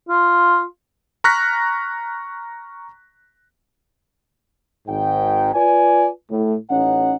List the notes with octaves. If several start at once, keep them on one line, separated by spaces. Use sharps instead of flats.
F4
A#5 C#6 F6 F#6 A#6 B6
G#1 G#2 G5
F4 B4 D5 G#5
A2
A1 C#4 D#4 F#5